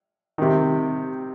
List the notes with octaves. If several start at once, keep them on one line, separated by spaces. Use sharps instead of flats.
C3 D#3